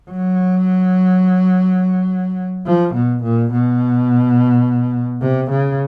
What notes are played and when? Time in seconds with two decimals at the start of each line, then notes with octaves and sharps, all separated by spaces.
0.11 F#3
2.66 F3
2.95 B2
3.23 A#2
3.52 B2
5.21 C3
5.51 C#3